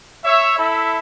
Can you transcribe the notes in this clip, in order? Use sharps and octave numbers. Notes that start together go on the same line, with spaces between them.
C#5 E5
E4 A4 E5 B5